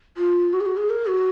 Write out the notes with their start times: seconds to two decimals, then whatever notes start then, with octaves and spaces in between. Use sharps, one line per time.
0.17 F4
0.53 F#4
0.60 G#4
0.66 F#4
0.77 G#4
0.90 A#4
1.08 F#4